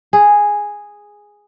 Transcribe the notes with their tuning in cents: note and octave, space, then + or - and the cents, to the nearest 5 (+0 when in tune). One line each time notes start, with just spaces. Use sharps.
G#4 -5